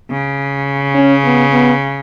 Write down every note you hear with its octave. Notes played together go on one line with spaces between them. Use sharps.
C#3
C#4
B3
B3